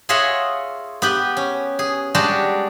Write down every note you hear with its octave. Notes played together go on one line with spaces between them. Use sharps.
F4 G#4 C#5 D#5 E5 F#5
B3 G4 B4
C#4
G#4
G3 G#3 D4 F#4 G4